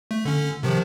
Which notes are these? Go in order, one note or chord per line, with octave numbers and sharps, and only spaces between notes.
A3
D3 C#4
C3 D#3 F3